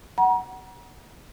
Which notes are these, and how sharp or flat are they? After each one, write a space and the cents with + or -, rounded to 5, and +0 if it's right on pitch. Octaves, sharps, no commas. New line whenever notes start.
F#5 +15 A#5 +40